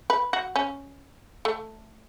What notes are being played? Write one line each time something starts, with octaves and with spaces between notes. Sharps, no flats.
B4
F#4
C#4
A3